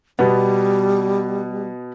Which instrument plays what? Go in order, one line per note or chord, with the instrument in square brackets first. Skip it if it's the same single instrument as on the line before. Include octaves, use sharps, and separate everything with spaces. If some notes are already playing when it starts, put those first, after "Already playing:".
[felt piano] B2 B3 [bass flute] G3